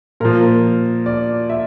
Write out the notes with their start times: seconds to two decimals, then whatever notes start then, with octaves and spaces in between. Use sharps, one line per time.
0.20 A#2 F3 A#4
1.06 D5
1.50 E5